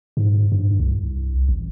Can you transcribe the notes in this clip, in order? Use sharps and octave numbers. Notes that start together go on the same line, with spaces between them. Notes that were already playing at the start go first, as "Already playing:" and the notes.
G#2
G2
C2
A1